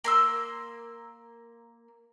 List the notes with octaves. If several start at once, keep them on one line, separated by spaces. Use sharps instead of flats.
A#3 C6 E6